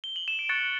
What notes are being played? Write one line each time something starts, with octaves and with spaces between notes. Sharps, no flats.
G7
F#7
E7
D7
C#6 F#6 A6 C#7